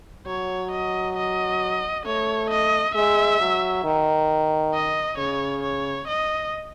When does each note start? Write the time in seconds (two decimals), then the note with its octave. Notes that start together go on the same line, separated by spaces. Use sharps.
0.27 F#3 C#5
0.71 D#5
1.17 D#5
2.06 A3 C#5
2.51 D#5
2.95 G#3 E5
3.40 F#3
3.84 D#3
4.74 D#5
5.18 C#3 C#5
5.63 C#5
6.08 D#5